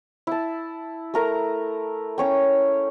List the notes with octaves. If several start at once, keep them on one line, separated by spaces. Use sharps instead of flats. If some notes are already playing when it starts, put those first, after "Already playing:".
E4 A5
A3 A#4 A#5
C#4 C#5 G5